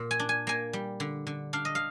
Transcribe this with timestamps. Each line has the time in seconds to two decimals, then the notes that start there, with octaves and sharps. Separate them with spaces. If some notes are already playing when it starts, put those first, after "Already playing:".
Already playing: A#2
0.11 G#5
0.20 D4
0.29 G#5
0.47 A#3 G#5
0.73 G3
1.00 D3
1.27 D3
1.53 D4 F5
1.65 D#5
1.75 F5